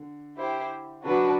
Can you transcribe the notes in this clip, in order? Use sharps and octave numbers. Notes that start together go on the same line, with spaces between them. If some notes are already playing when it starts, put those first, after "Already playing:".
Already playing: D3
E4 G4 C5
D3 F#3 D4 F#4 B4